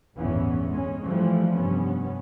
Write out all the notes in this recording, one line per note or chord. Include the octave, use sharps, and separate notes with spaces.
G1 E2 A2 E3 B3 C#4
G#3 C#4
E3 F3 G3 A3
F1 G2 B3 C#4